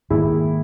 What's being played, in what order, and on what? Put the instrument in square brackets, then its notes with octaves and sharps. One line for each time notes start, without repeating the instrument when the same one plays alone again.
[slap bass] G#2 D#3 A#3 [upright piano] E4 G#4